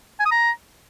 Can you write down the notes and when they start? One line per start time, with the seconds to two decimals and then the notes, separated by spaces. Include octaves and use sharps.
0.19 G#5
0.25 D#6
0.31 A#5